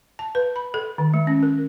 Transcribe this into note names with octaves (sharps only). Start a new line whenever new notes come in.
A5
B4
B5
A4
D#3
G#3
C#4
A#4